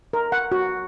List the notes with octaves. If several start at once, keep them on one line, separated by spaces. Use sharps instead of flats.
A#4
F#5
F#4